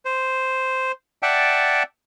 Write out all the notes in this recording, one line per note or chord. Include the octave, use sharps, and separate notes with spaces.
C5
D5 E5 F#5 G5 A5